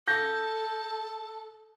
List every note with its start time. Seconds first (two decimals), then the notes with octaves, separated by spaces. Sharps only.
0.08 A4 A5 G6 A#6